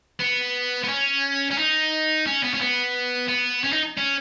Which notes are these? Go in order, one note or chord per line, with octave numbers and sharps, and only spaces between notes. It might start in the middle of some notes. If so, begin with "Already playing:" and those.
B3
B3
C#4
C#4
D#4
C#4
B3
C#4
B3
B3
C#4
D#4
C#4